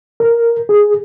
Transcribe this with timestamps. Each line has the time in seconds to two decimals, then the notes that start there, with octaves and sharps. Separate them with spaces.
0.20 A#4
0.69 G#4